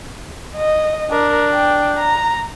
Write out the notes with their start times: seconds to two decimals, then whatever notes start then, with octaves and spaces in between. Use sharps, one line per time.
0.57 D#5
1.11 D4 A#4
1.52 G5
1.98 A#5